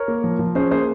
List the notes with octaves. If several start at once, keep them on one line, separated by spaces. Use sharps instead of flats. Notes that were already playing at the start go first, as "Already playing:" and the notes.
Already playing: A#4 C#5
A#3
F3
F3
C#4 G#4 C5
A#3 G#4 C5